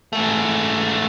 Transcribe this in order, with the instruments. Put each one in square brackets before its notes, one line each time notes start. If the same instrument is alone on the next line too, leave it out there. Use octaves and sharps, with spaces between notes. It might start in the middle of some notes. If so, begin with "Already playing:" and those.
[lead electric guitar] G#2 A3